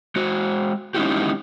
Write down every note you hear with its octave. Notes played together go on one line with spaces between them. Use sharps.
G#3 F#4
G#3 C#4 D#4 E4 F#4 G4